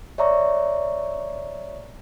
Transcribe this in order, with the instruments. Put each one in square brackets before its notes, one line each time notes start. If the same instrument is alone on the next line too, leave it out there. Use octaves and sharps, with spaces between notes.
[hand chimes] C#5 D5 E5 A#5 C#6